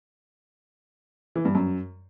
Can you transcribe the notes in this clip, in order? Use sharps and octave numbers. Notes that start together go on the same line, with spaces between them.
E3
G2
F#2